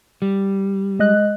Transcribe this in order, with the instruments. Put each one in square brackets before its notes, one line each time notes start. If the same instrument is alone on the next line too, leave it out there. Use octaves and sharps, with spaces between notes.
[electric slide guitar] G3
[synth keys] G#3 D#5 F#6